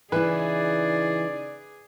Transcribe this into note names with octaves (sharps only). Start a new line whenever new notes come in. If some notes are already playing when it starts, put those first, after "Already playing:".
C#3 E3 D#4 E4 G#4 B4 D5